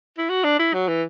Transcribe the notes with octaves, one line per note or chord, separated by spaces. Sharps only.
E4
F#4
D4
E4
F#3
E3